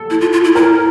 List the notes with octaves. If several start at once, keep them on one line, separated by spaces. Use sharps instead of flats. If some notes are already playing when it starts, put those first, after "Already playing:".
Already playing: A4
E4
F4
F4
E4
E4 A#4